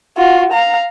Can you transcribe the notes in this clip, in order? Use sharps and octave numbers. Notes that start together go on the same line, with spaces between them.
F4 F#4
F5 A#5